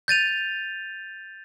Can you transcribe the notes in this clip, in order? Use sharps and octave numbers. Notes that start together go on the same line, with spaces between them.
G6 A6 D#7 F7